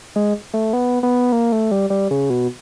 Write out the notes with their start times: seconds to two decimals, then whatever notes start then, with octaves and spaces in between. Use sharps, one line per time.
0.16 G#3
0.54 A3
0.73 B3
1.03 B3
1.32 A#3
1.52 A3
1.71 G3
1.90 G3
2.11 C#3
2.30 B2